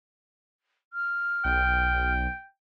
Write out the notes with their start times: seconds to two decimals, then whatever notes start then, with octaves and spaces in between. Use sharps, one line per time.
0.93 F6
1.45 B1 G5